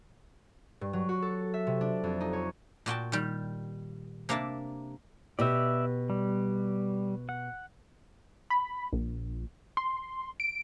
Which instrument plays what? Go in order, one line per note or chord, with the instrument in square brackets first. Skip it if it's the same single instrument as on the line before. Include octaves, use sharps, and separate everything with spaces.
[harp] G2
F#3
F#4
A4
E5
C3
D4
F2
D#4
C#5
[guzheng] A#2 F#4 G5 A5
D#3 G3
C3 A#3 D4 E5 A5
[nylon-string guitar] B2 G4 [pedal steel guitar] D5 E5
[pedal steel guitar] G3
F#5
[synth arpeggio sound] B5
A#1
C6
D7